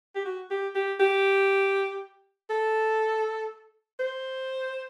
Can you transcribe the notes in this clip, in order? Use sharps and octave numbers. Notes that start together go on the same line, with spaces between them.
G4
F#4
G4
G4
G4
A4
C5